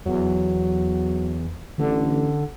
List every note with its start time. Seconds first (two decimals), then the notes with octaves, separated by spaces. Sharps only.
0.06 E2 F#3
1.78 A1 D3